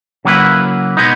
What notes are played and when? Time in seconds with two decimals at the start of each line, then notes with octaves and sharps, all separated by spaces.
0.25 C#3 F#3 A#3 E4 B4
0.97 B2 G#3 B3 D#4